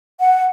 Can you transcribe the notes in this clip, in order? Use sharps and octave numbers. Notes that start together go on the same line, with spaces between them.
F#5